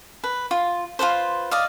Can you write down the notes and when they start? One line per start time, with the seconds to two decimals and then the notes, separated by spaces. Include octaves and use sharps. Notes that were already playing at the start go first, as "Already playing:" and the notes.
0.24 B4
0.51 F4
0.99 F4 A4 B4 C5
1.51 D5 D#5 F5